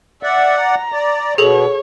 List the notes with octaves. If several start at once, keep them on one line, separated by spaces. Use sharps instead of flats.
D5 E5 F#5
A#5
D5
B2 G#4 A4 C#5